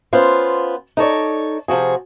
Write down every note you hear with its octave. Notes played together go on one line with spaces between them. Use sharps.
B3 C#4 F4 C5
D#4 A4 C#5 D5
C3 F3 F#4 G#4